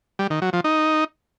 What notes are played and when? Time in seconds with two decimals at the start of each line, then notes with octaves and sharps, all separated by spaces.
0.19 G3
0.30 D#3
0.42 F#3
0.53 F3
0.64 D#4